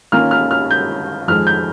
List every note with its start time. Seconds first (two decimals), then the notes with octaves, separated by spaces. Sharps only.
0.12 D#3 A#3 C#4 F4 F6
0.31 F6
0.51 F6
0.71 G6
1.27 F2 D#3 G#3 F6
1.47 G6